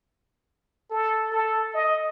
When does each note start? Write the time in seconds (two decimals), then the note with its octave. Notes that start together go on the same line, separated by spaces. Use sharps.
0.91 A4
1.32 A4
1.74 D#5